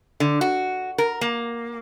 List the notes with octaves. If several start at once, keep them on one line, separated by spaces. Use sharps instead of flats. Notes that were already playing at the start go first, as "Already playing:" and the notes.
D3
F#4
A#4
A#3